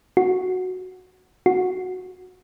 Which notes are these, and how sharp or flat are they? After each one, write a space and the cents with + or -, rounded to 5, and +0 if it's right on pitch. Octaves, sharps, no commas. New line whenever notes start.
F#4 -5
F#4 -10